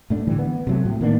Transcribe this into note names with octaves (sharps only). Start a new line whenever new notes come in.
A2 A3 D4
D3 E3 G3
B3
C3 F#3 A3
A2
D#3 A#3 B3 D4